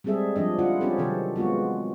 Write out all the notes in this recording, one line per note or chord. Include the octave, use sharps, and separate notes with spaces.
G3 G#3 C4 G#4 A4 E5
F3 G3 D4 D#5
C#3 E4 F4 F#5
C4 C#4 F4 G4 A4
C3 D#3 F#3 A4 C5
G#3 B3 F4 F#4